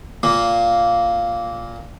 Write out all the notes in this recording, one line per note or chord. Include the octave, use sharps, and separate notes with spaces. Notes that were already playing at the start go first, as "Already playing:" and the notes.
A#2 A#3